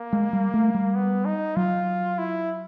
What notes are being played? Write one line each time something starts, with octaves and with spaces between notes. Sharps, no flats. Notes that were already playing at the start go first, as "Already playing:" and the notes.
Already playing: A#3
G#3
G3
A3
G3
B3
D#4
F#3 F4
E4